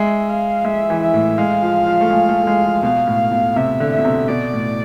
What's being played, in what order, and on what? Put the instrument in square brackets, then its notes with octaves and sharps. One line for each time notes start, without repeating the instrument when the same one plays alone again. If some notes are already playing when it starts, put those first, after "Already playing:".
Already playing: [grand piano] G#3 [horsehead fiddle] E5
[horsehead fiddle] F5
[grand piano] G#3 [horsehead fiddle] E5
[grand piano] E3
[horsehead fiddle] E5
[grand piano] A2
[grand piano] G#3 [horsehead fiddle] F5
[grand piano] F3
F3
A3
G#3
A3
A3
G#3
F3
[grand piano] B2 [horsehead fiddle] F5
[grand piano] A2
B2
[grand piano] C3 [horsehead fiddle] E5
[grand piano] D3
[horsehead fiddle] E5
[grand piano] B2
C3
[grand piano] B2 [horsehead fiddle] D5
[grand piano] A2